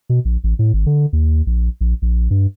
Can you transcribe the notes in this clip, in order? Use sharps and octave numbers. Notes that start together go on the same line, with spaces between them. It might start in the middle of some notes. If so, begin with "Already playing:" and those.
B2
A#1
A1
A2
G#1
D3
D#2
A#1
A#1
A#1
G2